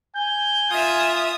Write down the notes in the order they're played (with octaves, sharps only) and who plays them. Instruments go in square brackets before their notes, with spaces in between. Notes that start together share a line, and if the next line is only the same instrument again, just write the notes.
[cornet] G#5 [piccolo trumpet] G6
[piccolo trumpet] F4 [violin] E5 D#6